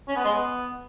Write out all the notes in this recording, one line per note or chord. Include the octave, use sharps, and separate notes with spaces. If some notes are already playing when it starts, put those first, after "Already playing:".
C#4
B3
G#3
B3